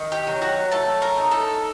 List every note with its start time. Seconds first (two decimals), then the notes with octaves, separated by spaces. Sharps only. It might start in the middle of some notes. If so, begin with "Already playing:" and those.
Already playing: D#3
0.12 G4 G5
0.27 F#3
0.42 F#4 F#5
0.72 A3 A4 A5
1.02 A#4 A#5
1.17 D#4
1.31 A4 A5